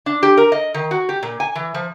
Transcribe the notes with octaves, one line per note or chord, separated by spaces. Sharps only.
D4
G4
A#4
D#5
D#3
F#4
G4
A#2
G#5
E3
F3